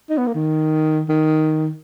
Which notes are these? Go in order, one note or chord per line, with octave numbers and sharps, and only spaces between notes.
D#4
B3
A#3
D#3
D#3